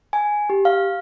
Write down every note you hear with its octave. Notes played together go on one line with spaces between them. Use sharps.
G#5
G4
F5